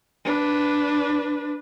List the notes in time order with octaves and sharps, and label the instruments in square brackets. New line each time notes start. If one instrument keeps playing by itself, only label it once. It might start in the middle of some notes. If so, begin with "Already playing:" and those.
[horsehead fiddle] D4 B4